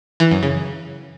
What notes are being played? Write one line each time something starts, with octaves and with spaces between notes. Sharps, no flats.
E3
F#2
C#3